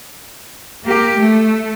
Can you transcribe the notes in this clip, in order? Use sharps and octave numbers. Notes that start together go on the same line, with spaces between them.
A#3 G4
A3